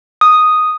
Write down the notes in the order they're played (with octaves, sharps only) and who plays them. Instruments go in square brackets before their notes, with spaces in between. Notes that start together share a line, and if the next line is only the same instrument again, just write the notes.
[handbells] D#6